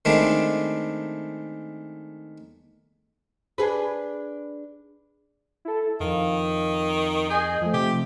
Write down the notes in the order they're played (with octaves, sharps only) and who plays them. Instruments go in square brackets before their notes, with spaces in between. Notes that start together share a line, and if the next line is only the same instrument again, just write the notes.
[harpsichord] D#3 G#3 A3 C4 D4 E4
[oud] D4 G#4 B4
[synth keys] E4 A4
[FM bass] F2 [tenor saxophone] D#3 [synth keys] F5
[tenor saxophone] G#4 [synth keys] D#5 G#5 G6
[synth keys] F3 A3
[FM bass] C3 [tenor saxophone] G4